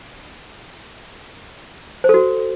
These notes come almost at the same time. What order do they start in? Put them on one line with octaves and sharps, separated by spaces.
C5 A4 F#4